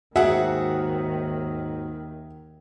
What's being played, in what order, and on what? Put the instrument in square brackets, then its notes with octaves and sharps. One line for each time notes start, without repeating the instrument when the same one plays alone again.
[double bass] D#2 D#3 [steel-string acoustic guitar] G#2 F#4 [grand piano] G#4 E5 F#5